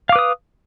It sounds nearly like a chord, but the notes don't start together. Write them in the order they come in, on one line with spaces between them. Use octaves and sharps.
F5 D6 B4 D#6